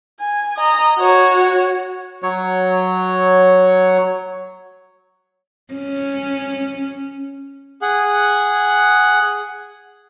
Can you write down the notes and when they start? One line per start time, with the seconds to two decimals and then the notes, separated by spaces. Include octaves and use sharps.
0.20 G#5
0.57 D#5 A#5
0.99 F#4 C#5
2.23 F#3 C#5
5.74 C#4
7.82 G#4 F#5